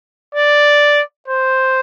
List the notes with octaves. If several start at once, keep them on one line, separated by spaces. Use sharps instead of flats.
D5
C5